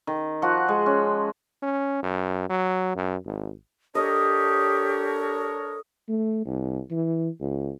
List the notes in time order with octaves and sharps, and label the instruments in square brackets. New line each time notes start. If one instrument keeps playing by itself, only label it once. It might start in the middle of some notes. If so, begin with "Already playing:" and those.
[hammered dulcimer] D#3
F3 F#4 F#5
G#3
C#4
[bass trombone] C#4
F#2
F#3
F#2
G#1
[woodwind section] D4 A#4 C#5 [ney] G4 [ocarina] A4 [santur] D#5
[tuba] A3
C2
E3
C#2